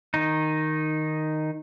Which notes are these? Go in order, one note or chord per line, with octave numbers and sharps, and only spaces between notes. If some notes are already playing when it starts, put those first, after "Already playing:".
D#3 D#4